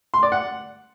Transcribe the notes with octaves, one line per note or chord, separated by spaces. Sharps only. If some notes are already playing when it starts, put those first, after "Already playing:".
C6
D5
F#5